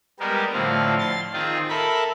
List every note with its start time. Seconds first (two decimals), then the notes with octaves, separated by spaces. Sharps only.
0.20 G3 G#3 B3 G4 A#4
0.53 A2 D3 F3 C4 F5
0.99 C6 A6
1.33 D#3 C4 F4 G#4
1.69 A4 A#4 E5 A5 B5